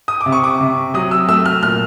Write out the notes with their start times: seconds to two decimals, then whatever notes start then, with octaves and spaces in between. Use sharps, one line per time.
0.08 D#6
0.21 D6
0.26 C3
0.32 C#6
0.44 D6
0.60 C3
0.94 F#3 D#6
1.11 E6
1.29 A3 E6
1.45 F6
1.63 A#2 F6